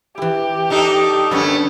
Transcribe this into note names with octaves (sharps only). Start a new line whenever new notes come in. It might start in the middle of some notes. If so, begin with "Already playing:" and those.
E3 E4 G4
D4 D#4 A4
F#2 D3 G3 A3 B3 C#4